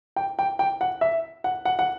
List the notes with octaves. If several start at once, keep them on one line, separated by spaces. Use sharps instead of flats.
G5
G5
G5
F#5
E5
F#5
F#5
F#5